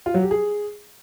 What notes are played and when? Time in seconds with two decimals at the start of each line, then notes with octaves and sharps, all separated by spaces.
0.06 F4
0.14 F#3
0.23 G4
0.31 G#4